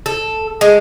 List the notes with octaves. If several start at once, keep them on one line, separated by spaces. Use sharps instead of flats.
A4
G#3